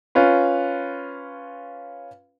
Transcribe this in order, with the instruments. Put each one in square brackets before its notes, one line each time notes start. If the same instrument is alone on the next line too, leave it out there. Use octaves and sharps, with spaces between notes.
[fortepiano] C#4 F4 B4